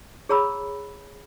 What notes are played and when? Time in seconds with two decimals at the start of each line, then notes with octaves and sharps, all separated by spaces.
0.29 G#4 C#5 A#5 B5 E6